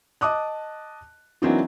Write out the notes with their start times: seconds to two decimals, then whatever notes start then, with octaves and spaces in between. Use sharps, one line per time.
0.21 D#5 A5 D6 D#6 F#6
1.42 E3 F#3 A#3 C4 D4 D#4